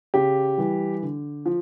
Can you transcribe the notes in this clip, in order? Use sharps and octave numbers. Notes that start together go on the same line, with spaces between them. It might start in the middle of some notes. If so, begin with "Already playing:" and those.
C#3 G4
E3 G3
D3
F3